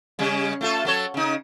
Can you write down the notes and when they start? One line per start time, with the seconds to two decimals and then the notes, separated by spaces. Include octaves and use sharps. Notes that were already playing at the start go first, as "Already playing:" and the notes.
0.19 C#3 G3 C#4
0.61 A3 F4 A4
0.85 F#3 A4 C#5
1.14 C#3 D#4